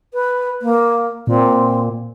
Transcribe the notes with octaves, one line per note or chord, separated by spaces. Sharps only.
B4
A#3
A#2 C4